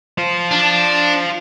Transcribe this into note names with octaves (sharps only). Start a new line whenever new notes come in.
F4 C5
D4